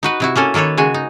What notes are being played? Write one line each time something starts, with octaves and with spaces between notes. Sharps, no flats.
D#4 F#4 B4
C3 E4 F#4
A#3 C#4 A4 G#5
D#3 A#3 A4 B4 C#5
C#3 G#3 F#4 G#5
D#4